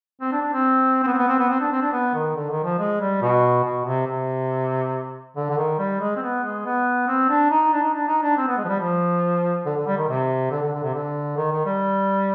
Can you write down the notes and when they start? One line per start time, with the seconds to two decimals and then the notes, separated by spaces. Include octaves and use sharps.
0.21 C4
0.32 D4
0.42 D4
0.53 C4
1.03 C4
1.07 B3
1.14 C4
1.18 B3
1.28 C4
1.39 B3
1.50 C4
1.61 D4
1.72 C4
1.82 D4
1.92 B3
2.14 D#3
2.36 D3
2.50 D#3
2.64 F3
2.79 G#3
3.01 G3
3.22 B2
3.64 B2
3.85 C3
4.07 C3
5.36 D3
5.50 D3
5.57 D#3
5.78 G3
6.01 G#3
6.16 C4
6.22 B3
6.43 G#3
6.66 B3
7.07 C4
7.29 D4
7.51 D#4
7.73 D4
7.83 D#4
7.94 D4
8.08 D#4
8.23 D4
8.37 C4
8.47 B3
8.58 G#3
8.64 F3
8.68 G3
8.80 F3
9.66 D3
9.77 D3
9.87 G3
9.98 D#3
10.09 C3
10.51 D3
10.63 D3
10.73 D3
10.84 C3
10.94 D3
11.37 D#3
11.52 D#3
11.66 G3